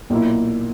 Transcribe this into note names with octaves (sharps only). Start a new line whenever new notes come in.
B1 A#2 A#3 E4